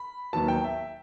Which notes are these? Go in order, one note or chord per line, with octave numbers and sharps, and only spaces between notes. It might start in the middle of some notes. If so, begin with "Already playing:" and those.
Already playing: B5
D#2 D#3 F#3 B3 A5
G5
E5